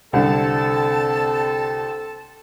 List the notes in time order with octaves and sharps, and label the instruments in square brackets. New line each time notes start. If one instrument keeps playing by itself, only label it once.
[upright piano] C2 D3 [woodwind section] C4 A4 A5